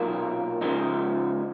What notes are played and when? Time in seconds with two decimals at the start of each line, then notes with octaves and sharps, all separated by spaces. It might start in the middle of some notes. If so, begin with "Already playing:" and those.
Already playing: B1 A#2 F#3 A#3 D#4
0.61 C#3 F3 G#3 D#4